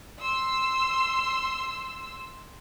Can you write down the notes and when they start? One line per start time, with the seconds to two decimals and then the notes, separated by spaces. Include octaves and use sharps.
0.20 C6 E6